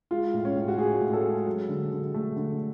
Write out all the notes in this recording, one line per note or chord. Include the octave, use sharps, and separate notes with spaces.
G#3 F4
A2
C#4
A2
F#4
A2 G#4
A2
A4
G#3
F#3
D3
D3
A3
D3